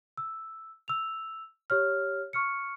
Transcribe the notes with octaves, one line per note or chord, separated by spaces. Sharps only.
E6
E6 F7
G4 C#5 F6
C#6 F6 C#7